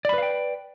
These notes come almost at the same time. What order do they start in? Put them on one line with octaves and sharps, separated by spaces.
D5 B5 B4 F5 G5